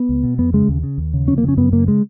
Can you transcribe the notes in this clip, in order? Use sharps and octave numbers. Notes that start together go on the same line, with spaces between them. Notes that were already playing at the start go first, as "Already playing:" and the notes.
Already playing: B3
C#2
B2
F2 B3
C#3 G#3
D#2
C#3
D#2
C#3
F2 C#4
A#3
C#3 C#4
F#2 B3
C#3 A#3
G#3